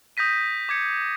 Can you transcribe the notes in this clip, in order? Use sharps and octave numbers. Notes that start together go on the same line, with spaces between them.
D#6 G6 A#6 B6 D#7
D6 G#6 C#7